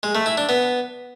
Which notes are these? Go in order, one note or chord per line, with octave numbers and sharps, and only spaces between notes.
G#3
A3
E4
D4
B3